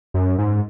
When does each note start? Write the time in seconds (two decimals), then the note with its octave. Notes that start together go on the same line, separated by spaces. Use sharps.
0.14 F#2
0.38 G#2